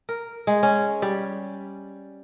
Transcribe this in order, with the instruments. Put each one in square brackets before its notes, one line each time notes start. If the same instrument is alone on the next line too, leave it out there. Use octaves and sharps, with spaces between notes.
[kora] A#4
G#3
C#4
G3